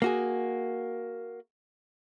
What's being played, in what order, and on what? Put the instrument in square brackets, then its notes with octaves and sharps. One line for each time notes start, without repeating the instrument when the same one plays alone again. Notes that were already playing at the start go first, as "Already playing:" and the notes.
[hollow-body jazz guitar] A#3 F#4 G#4